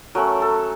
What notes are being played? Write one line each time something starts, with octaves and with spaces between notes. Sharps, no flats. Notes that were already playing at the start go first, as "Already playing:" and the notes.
F#3 A3 C#4 A#4
A4